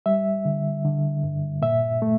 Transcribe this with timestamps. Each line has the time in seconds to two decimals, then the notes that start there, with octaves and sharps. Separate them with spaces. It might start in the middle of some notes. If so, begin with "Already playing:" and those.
0.06 G3 E5
0.45 D3
0.84 D3
1.24 G2
1.62 A#2 E5
2.02 A3